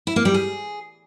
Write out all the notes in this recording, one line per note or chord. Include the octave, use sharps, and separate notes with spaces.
E4
A#3
G3
G#4